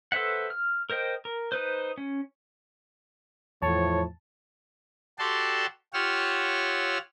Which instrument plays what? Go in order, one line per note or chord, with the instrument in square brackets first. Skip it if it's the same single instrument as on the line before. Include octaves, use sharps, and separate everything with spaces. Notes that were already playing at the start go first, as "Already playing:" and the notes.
[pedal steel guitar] A4 B4 C5 E5 F#5
F6
A#4 C5 D#5 G5
A#4
D#4 B4 C5
C#4
[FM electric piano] E2 A5 [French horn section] A2 F3 [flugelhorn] C#5
[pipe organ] F#4 G4 A4 D5 A5 C6
F4 G4 C#5 F#5 E6 F6